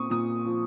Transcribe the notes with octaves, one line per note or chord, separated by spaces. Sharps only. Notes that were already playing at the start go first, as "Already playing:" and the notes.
Already playing: A#2 C4 C#6 D#6
A#2 D#6
F3